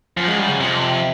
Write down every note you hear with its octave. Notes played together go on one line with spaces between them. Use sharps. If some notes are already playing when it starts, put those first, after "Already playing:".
F#2 F3
G#3
G3
C#3
F2 C3